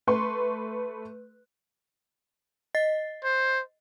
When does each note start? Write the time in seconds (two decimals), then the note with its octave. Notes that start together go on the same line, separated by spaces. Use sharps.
0.07 A3 B4 C6 C#6
2.75 D#5 A6 C7
3.24 C5